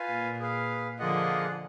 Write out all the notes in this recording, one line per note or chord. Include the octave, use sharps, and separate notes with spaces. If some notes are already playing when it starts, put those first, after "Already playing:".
Already playing: F4 B4 F5 G#5
A#2
G#4 B4 F5
D3 F3 A#3 F4 G#4 D#5 F#5